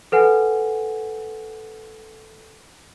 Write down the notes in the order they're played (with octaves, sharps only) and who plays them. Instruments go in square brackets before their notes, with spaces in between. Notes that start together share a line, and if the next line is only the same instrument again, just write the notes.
[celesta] A4 B4 F#5 G#5